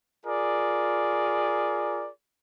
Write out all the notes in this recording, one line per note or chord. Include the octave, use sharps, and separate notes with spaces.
F4 G#4 A#4 D5